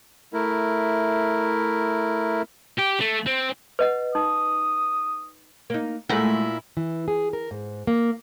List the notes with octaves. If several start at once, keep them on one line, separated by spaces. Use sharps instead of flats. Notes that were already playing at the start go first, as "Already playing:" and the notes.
A3 E4 A#4
G4
A3
C4
B4 D#5 F#5
D#4 D#6
A#3 D#4
A#2 G#3 A3 E4 F#4
E3
G#4
A#4
G#2
A#3